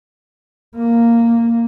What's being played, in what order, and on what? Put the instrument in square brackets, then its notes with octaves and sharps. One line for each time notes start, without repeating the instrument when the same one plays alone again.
[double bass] A#3